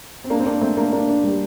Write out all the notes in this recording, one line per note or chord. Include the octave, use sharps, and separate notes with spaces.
C4
A#3 D4
C4
A#3 D4
A3 C4
A#3 D4
A#3 D4
A#3 D4
G3 A#3